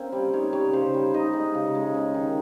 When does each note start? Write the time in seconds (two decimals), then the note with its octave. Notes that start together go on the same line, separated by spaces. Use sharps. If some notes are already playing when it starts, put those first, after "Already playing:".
Already playing: A#3 C4 C#4 C5
0.12 G3
0.33 D#4 C#5
0.53 G3 C#5
0.73 C#3 C5
0.94 G3
1.13 D#4 D#5
1.33 G#3
1.55 C#3
1.75 G#3
1.94 C#4
2.14 D#3